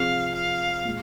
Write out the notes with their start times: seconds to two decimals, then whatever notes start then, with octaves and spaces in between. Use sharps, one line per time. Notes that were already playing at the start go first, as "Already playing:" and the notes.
Already playing: C3 F3 C4 F4 G#4 F5
0.35 F5
0.85 A#2 G#3